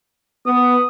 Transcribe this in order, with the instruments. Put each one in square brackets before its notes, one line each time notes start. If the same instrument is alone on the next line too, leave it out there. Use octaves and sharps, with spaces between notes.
[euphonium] B3 [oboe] D#6